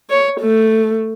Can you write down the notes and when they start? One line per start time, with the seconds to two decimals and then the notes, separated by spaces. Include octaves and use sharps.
0.10 C#5
0.41 A3